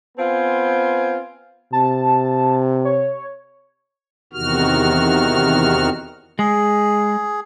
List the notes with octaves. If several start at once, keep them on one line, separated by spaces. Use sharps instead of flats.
B3 C4 F4 G#5
C3 A5
C#5
E2 C3 D#3 F#4 F6
G#3 G#4